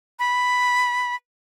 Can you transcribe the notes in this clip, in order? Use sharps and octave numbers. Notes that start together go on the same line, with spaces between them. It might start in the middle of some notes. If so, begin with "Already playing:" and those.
B5